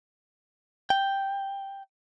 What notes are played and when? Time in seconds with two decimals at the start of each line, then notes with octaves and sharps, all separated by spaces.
0.90 G5